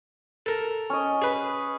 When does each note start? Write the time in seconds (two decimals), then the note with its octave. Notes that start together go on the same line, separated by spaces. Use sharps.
0.46 A4 A#4
0.90 C#4 D#5
1.22 G#4 B4